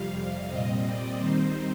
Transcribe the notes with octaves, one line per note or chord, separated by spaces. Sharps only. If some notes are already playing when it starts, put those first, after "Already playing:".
Already playing: F2 C3 G3 F5
F5
A#2 G3 C4 D#5
D5
D#3 G3 C4 D#4 C5